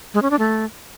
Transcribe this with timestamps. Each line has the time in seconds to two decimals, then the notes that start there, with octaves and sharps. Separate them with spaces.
0.14 G#3
0.22 C#4
0.31 D4
0.39 A3